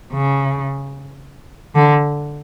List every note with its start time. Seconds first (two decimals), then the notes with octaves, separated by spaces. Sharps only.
0.13 C#3
1.75 D3